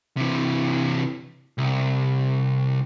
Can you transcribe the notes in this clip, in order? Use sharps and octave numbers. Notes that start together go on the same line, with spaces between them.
C3 E3
C2